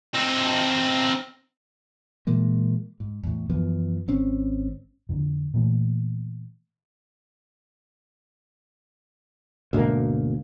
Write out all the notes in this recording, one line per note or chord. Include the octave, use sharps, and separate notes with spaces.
C4 D#4
A#2 E3 G#3 A#3
G#2
E2 A2
F#2 E3 F3 B3
G#1 C4 C#4
F2 D3
A#2 E3 A3
D2 G#2 B2 A#3